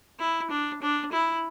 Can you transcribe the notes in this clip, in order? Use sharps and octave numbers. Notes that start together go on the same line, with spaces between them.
E4
D4
D4
E4